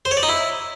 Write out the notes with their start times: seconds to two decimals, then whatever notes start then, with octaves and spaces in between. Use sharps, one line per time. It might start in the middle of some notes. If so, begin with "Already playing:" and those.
0.05 C5
0.11 C#5
0.17 D5
0.23 D#4
0.29 E4